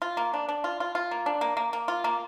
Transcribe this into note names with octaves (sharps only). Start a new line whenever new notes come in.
F4
A#3
D4
D4
F4
F4
F4
A#3
D4
A#3
A#3
A#3
F4
A#3